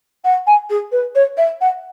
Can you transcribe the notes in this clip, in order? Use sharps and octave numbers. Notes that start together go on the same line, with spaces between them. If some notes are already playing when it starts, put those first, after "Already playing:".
F#5
G#5
G#4
B4
C#5
E5
F#5